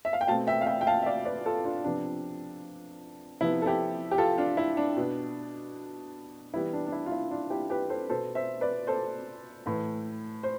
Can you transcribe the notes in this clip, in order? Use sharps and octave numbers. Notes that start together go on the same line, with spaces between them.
E5
F5
G5
B2 A3 C4 F5 A5
E5 G5
F5
E5 G5
G5
F5 A5
E5
D5 F5
B4 D5
F4 A4
D4 F4
C3 F3 B3 D4
C3 F3 B3 E4
A4
E4 G4
G4
F4 A4
D4 F4
E4
D4
B2 B3
E3 G3 B3 E4
D4
D4
E4
F4
E4
D4 F4
E4 G4
G4 B4
A4 C5
B2 B3 A4 C5
C5 E5
B4 D5
A4 C5
A2 E3 A3
C5